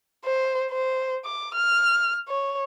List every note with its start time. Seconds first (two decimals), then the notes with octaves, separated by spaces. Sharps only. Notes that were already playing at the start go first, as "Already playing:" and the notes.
0.24 C5
0.71 C5
1.25 D6
1.54 F6
2.28 C#5